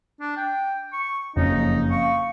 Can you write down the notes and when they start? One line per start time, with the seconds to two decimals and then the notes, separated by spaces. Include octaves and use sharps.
0.21 D4
0.37 G5
0.93 C#6
1.36 F#1 F2 C#4 D#4
1.91 F5 C#6